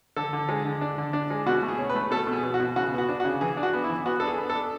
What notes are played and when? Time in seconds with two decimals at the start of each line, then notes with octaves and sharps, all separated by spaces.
0.16 D3 A4
0.33 D3
0.49 G#3
0.65 D3
0.81 D4
0.98 D3
1.13 D4
1.30 G#3
1.46 B2 F#4
1.62 A3
1.68 G#4
1.79 C#4
1.90 B4
1.95 A3
2.11 B2 A4
2.27 B2
2.33 G#4
2.43 B2
2.54 F#4
2.60 B2
2.76 C#3 F#4
2.93 B3
2.98 F#4
3.09 D4
3.20 F#4
3.25 C#3
3.41 E3 G#4
3.57 D4
3.63 F#4
3.73 B3
3.84 E4
3.90 E3
4.06 B3 F#4
4.20 D4 A4
4.27 G#4
4.38 B3
4.50 A4
4.55 D4